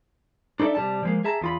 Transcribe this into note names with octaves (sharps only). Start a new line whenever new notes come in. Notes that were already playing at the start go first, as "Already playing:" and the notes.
D4 D#4 A4 D5 E5
C3 G3 A5
F3 G#3 A#3
G#4 E5 A5 A#5
E2 F4 B5